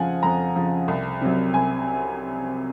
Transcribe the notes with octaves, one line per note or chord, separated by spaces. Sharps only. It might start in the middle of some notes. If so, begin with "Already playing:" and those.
Already playing: F2 C#3 F3 F5 F#5 G#5
F2 A#5
C#3 F3
C2
C3 F#3
C2 G#5